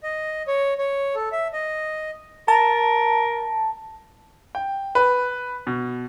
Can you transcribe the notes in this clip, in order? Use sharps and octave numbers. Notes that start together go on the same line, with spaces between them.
D#5
C#5
C#5
A4
E5
D#5
A#4 A5
G5
B4
B2